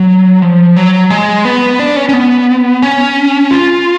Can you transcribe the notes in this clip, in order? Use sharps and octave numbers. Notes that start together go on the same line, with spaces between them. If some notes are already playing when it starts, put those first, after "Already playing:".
Already playing: F#3
F3
F#3
G#3
B3
D4
C#4
C#4
B3
C#4
F4